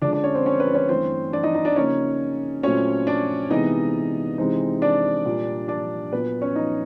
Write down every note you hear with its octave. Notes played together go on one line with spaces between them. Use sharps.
D3 F3 G#3 C#4 D4 D5
D4 D5
C#4 C#5
C4 C5
C#4 C#5
B4
C#4 C#5
G2 E3 A3 C4 C#4 C5
D4 D5
D#4 D#5
D#4 D#5
D4 D5
C#3 F3 A#3 C#4 D#4 C#5
A#2 F#3 A3 C4 C#4 C#5
D4 D5
C3 E3 G#3 B3 D#4 D#5
C3 E3 G#3 C4 D#4
D4 D5
A#2 G3 A#3
D4 D5
A#2 F#3 B3 B4
C#4 C#5
D#4 D#5